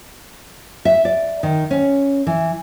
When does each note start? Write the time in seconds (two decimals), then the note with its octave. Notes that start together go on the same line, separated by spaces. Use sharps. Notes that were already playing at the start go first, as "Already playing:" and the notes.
0.85 E5
1.05 D5
1.43 D#3
1.71 C#4
2.27 E3